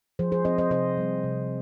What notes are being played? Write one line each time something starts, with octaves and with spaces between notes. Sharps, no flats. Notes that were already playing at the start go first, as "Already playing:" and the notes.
F3 G#4 C5
G#4 C5
C4 C5 D#5
C5 D#5
C3 C5 D#5
G3 C4
C3